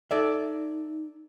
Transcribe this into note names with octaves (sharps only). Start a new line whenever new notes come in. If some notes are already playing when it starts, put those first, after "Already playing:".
D#4 A4 D5 E5